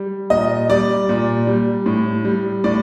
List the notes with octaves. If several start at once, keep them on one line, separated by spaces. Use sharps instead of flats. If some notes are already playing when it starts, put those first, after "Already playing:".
Already playing: G3
A#2 D#5
G3 D5
A#2
G3
A2
G3
A2 D5